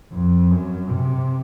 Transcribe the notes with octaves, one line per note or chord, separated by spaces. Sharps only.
F2
F#2
C3